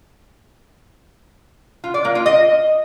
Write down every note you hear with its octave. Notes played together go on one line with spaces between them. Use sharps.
F4
D5
A#3
F4
D#5